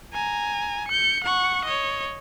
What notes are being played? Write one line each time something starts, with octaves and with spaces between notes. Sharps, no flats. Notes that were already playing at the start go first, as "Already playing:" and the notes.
G#5 A#5
G6 C#7
F#5 C#6
C#5 D#5